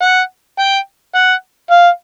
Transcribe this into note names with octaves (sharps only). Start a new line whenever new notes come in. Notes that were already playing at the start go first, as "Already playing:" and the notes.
F#5
G5
F#5
F5